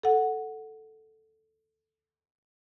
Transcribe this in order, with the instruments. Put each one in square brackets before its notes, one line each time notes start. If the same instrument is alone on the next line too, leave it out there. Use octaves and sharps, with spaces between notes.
[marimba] A4 F#5